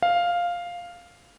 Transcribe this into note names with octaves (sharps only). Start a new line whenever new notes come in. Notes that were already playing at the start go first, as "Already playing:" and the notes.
F5